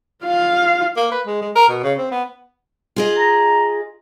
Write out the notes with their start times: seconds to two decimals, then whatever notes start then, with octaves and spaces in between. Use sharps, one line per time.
0.24 F4 F5
0.97 A#3
1.11 B4
1.27 G#3
1.42 G#3
1.56 A#4
1.69 B2
1.84 C#3
1.98 C4
2.11 B3
2.96 F4 G#4 D#5
3.17 A#5